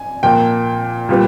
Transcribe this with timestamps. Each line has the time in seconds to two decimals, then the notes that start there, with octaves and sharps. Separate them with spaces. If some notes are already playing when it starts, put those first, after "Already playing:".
Already playing: G#5
0.23 A#2 F3 A#3 G5
1.09 A#2 G3 B3